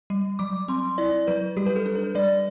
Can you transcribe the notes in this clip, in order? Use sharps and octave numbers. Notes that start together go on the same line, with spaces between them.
G3
F#3 D6
C4 C6
E4 D5
F#3 B4
G3 G4
B4
A4
D4
B4
G3 D5